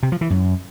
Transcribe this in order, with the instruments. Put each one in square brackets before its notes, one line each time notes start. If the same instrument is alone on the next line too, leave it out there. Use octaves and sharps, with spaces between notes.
[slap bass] C3
F3
E3
F#2